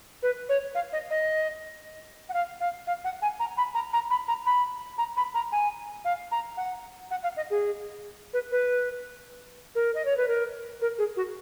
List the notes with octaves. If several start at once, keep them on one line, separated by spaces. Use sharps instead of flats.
B4
C#5
F5
D#5
D#5
F#5
F5
F5
F5
F#5
G#5
A#5
B5
A#5
A#5
B5
A#5
B5
A#5
B5
A#5
G#5
F5
A#5
F#5
F#5
F5
D#5
G#4
B4
B4
A#4
D#5
C#5
B4
A#4
A#4
G#4
F#4